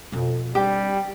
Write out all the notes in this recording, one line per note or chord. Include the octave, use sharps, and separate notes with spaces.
F2 B2
G3 C4 D4 G4